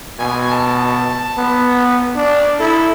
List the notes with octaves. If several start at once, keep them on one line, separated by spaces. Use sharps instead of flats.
B2 G#5
A5
B3
D4
E4 A4